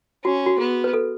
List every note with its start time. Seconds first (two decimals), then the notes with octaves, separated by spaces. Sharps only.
0.25 C#4 F#4
0.46 F#4
0.58 B3 G#4
0.84 B4
0.93 A4